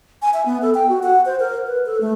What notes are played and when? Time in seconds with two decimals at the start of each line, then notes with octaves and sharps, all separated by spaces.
0.22 G#5
0.34 E5
0.46 B3
0.62 A4
0.74 G5
0.89 F#4
1.03 F#5
1.25 C5
1.40 A#4
1.67 B4
1.86 A4
2.01 A3